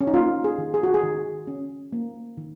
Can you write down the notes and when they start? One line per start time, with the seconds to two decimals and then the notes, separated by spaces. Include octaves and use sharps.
0.01 C#4
0.07 D#4
0.14 A#3 F4
0.44 G#4
0.58 D#3
0.74 G#4
0.83 F#4
0.94 G#4
1.03 D#3
1.47 C#4
1.93 A#3
2.37 D#3